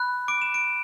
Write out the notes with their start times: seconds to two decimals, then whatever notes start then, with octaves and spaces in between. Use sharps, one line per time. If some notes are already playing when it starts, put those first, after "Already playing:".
Already playing: B5 F#6
0.28 D6 D7
0.42 E7
0.54 D7